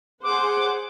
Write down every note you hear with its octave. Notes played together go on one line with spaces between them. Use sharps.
G#4 C5 F#5 D6